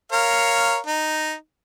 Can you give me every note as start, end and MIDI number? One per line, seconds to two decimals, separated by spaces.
0.12 0.78 70
0.12 0.78 73
0.12 0.78 77
0.86 1.33 63